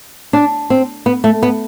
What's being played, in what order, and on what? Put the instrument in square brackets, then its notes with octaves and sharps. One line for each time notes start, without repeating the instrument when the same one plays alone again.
[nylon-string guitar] D4
C4
B3
A3
B3